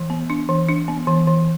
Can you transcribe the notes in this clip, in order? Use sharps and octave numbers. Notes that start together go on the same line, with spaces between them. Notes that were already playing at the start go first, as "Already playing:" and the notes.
Already playing: E3
B3
D4
E3
D4
B3
E3
E3